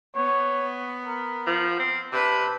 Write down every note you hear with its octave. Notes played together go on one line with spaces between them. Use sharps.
B3 C#5
A#4
F3
C4
C3 D4 B4